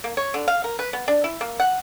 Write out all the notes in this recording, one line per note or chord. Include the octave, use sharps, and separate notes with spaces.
A#3
C#5
D3
F5
A#4
B4
B3
D4
E4
A#3
F#5